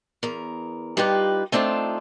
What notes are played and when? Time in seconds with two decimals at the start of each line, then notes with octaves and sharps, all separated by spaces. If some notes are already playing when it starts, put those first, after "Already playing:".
0.23 E2 A#4
0.97 G3 D#4 F4 G4 B4
1.52 A3 C4 D4 D#4 F4